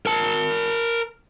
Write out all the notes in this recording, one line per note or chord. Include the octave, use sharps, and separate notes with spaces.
A#4 A5